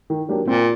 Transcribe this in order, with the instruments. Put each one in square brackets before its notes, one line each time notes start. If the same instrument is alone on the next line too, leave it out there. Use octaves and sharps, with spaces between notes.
[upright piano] D#3
F#3 A#3 D4 G4
[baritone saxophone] A#2 [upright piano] C4